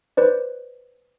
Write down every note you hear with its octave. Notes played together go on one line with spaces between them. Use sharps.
B4 C5 D5